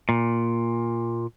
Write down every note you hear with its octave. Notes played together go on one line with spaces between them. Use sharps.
A#2